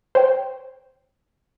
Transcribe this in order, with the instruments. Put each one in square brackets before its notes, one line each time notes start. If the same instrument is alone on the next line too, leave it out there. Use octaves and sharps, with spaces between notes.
[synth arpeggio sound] C5 C#5 G5